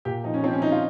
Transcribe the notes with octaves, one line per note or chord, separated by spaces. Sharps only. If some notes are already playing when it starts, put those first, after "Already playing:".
A#2 G4
F3 D#4
C#4
F3 C4
C#4
F3 D#4
F4